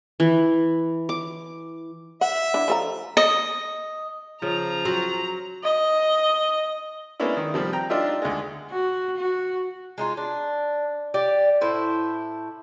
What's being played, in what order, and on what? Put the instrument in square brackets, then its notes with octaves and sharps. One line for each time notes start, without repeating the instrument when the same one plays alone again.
[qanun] E3
D6
[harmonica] E5 [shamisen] F#5
[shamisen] D4 E4
F3 A4 A#5
[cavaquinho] D#5
[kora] C#3 [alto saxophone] F3 [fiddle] A#5
[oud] F#3 [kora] C5
[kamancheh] D#5
[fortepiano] G#3 A#3 B3 C#4 D4 E4
D#3
C3 F3 G3
G5 A#5
D4 D#4 F4 G4 E5
D2 G#3
[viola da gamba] F#4
F#4
[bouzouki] G#3 D#4 F4
D4
G4 D5
A2 E4 C5